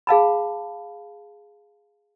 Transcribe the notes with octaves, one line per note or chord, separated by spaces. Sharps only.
G#4 F5 A5 B5